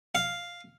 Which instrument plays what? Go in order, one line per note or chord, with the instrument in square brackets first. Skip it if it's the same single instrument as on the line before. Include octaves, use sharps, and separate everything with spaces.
[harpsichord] F5